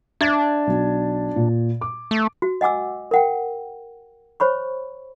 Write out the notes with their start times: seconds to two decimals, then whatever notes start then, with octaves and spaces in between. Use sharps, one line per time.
0.21 D4 E5 G#6 A6
0.67 B1
1.36 A#2
1.81 D6
2.11 A3
2.42 F#4
2.61 D#5 F#5 G#5 D6 E6
3.11 A#4 F#5 G5
4.40 C5 C#5 B5 C#6